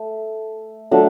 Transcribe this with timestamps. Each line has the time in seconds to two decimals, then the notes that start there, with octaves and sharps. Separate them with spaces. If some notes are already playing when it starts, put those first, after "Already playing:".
Already playing: A3
0.91 F#3 A3 D4